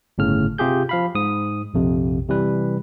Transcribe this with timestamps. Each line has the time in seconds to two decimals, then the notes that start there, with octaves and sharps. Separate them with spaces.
0.18 G1 A2 C#3 F6
0.58 C3 F4 G4 G#4 G6
0.89 F3 F5 B5
1.15 G#2 D#6
1.74 A#1 F2 C3
2.29 C3 E3 G3 B4